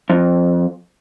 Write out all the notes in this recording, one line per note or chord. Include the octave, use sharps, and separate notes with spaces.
F2